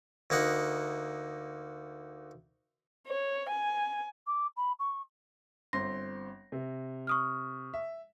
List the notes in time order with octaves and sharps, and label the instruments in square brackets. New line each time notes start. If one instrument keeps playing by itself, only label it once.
[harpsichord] D2 A#3 D#4 F#5
[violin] C#5
G#5
[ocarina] D6
B5
C#6
[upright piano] G1 C4 C6 [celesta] A#6
[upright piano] C3
[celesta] C#6 D#6 F6
[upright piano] E5